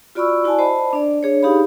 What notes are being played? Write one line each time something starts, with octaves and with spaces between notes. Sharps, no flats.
F4 F#4 D5 B5 C#6 E6
E4 F#4 D5 G#5 A5
C5 D#5 A5 B5
D4 D5
D4 G#4 C#5
D#4 G4 G#4 F5 B5